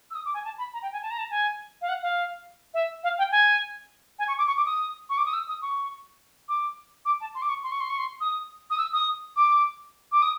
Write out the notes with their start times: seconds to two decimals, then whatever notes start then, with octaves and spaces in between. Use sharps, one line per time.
0.11 E6
0.15 D#6
0.25 D6
0.34 G#5
0.45 A5
0.58 B5
0.73 A#5
0.82 G5
0.93 G#5
1.02 A5
1.11 A#5
1.19 A5
1.30 G#5
1.82 F5
1.89 F#5
2.03 F5
2.74 E5
3.04 F5
3.18 G5
3.32 G#5
4.19 G#5
4.28 C#6
4.38 D6
4.47 C#6
4.57 D6
4.66 D#6
5.10 C#6
5.18 D6
5.26 D#6
5.34 E6
5.48 D#6
5.62 C#6
6.49 D6
7.05 D6
7.21 A5
7.35 C6
7.42 D6
7.49 C#6
7.63 C6
7.72 C#6
7.81 C6
7.90 C#6
7.98 C6
8.21 D#6
8.70 D#6
8.78 E6
8.93 D#6
9.36 D6
10.12 D6
10.22 D#6